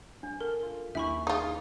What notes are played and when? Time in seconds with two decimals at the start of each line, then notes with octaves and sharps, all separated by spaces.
0.23 D4
0.41 A4 A#4
0.63 F4
0.95 D#2 C#4 D4 E4 E5 B5 C#6
1.27 D#4 F4 G#4 D#6